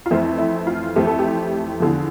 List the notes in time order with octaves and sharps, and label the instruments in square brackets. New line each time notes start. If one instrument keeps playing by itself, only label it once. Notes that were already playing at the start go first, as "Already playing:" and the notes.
[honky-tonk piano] F4
F2 E3 A3 C4 E4
E4
F4
F2 E3 A3 C4 G4
A4
G4
E2 D3 F3